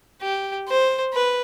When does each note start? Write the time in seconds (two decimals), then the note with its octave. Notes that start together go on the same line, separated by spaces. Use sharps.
0.22 G4
0.68 C5
1.13 B4